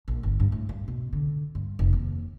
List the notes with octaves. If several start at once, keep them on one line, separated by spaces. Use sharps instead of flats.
A#1
G1
G2
A2
G2
B2
D3
G2
F1
D#2